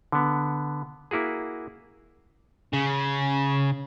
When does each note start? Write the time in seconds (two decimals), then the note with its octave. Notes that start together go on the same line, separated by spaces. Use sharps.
0.12 D3 B3
1.11 A#3 E4 F#4 G#4
2.73 C#3